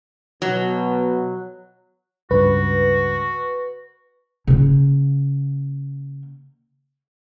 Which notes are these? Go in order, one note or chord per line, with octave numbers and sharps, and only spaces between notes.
B2 F#3
C#2 G2 F#4 B4
C#3 A#3